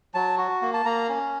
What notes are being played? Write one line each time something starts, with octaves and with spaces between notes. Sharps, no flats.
F#3 A5
F#4
A#3
A5
A#3 A#5
C#4